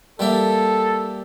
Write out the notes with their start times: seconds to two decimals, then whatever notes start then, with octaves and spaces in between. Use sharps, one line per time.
0.19 G3 A#3 A4 E5